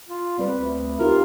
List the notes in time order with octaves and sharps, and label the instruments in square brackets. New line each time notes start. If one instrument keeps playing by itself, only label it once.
[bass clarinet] F4
[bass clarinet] G3 [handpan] C4 B4
[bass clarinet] D2
[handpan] D#4 F4 G4 [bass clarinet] A#4